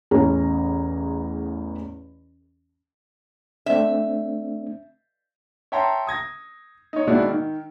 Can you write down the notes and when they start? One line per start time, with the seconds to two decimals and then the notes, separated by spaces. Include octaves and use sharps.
0.11 A1 E2 C#4 G#4 C#5 A#5
3.66 A3 C4 D4 E5
5.72 C#5 E5 G5 A5 A#5 C6
6.07 D#6 G#6 A#6
6.93 D#4 C#5
7.07 B2 D#3 G#3 D4 E4 F#4
7.30 D#3